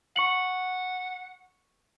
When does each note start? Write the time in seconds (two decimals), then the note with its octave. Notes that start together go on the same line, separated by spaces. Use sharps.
0.16 F#5 C#6 C#7 F#7